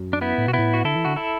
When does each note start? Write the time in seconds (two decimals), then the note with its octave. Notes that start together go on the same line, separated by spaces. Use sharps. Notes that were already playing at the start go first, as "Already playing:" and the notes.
Already playing: F#2
0.13 D4
0.21 B3 E4
0.38 A2
0.47 B2 F#4
0.53 B3 E4
0.59 A2
0.74 F#4
0.84 D3 E4 A4
0.96 E3
1.05 D3 F#4
1.16 E4 A4